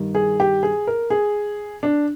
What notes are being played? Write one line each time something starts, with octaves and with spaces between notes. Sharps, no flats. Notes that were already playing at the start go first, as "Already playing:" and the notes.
Already playing: G2 D#3 G3
G#4
G4
G#4
A#4
G#4
D4